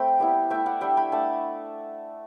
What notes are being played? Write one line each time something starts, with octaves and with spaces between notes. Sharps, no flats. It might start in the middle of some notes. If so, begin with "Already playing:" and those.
Already playing: A3 C4 G5 B5
G3 B3 E4
A3 E4 E5 G5
D5 F#5
G3 D4 E5 G5
G5 B5
A3 D4 F#5 A5